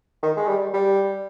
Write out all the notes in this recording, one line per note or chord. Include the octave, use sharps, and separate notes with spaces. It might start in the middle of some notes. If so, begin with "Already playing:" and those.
D#3
G#3
G3
G3